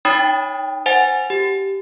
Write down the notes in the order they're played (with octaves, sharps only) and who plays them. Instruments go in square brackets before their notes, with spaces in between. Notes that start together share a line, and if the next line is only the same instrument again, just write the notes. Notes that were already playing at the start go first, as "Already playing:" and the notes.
[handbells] D#4 C#5 G5 B5 D#6 A6
C5 F#5 G#5 A6
G4